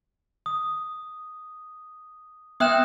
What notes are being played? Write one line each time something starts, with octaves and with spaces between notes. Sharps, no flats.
D#6
B3 E5 G5 D#6 F#6 E7